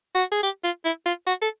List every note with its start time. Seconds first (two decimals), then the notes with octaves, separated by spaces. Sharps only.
0.15 F#4
0.32 G#4
0.43 G4
0.64 F4
0.84 E4
1.05 F4
1.27 F#4
1.42 A4